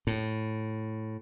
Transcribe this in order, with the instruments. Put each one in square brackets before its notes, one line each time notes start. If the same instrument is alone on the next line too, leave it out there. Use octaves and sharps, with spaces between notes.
[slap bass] A2